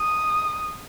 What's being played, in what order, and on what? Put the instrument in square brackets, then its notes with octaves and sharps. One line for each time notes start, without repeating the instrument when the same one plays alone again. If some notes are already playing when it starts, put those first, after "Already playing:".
Already playing: [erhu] D#6